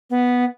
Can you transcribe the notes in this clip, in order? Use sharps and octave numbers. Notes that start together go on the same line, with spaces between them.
B3